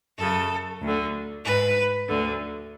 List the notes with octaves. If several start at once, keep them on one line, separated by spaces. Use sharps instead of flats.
F#2 C#3 A4
D2 D3
G#2 B4
D2 D3